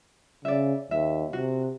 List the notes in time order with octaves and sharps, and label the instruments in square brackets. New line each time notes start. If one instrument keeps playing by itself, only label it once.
[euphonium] C#3 [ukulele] D5 E5
[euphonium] D#2 [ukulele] E5
[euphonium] C3 [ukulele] F#4